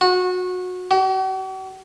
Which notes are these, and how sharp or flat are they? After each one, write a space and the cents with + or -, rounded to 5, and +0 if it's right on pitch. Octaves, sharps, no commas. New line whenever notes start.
F#4 -25
F#4 +45